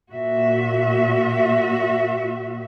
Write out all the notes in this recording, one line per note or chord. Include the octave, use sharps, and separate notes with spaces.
A#2 F#4 E5